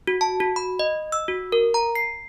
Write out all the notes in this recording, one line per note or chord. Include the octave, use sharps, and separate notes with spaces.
F#4
A5
F#4
B5
D#5
E6
F#4
A#4
A#5
C7